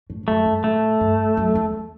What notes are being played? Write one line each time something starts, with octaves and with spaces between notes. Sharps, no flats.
A2
E2
F#2 A3
G2
A2 A3
G2
F#2
E2